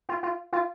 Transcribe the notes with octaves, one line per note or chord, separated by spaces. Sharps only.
F4
F4
F4